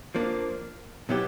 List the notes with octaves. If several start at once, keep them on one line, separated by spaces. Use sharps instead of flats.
F3 A#3 D4
B2 F#3 B3 E4 G4